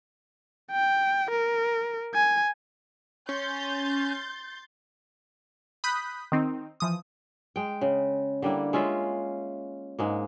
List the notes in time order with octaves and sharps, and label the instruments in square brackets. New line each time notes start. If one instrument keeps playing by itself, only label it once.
[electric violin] G5
A#4
G#5
[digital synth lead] C#4 [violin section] C6 G6 A6
[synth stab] B5 D#6 F#6 G6 B6
D#3 C4 D#4
E3 F3 D#6
[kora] G#3 G5
C#3
D3 G3 A#3 E4
G#3 C#4 F4 E5
G#2 G#3 A#3